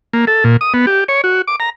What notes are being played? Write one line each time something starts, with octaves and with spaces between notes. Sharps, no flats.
A#3
A4
A#2
D#6
B3
G4
C#5
F#4
D6
A#5